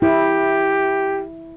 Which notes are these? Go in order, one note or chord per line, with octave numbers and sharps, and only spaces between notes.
E4 G4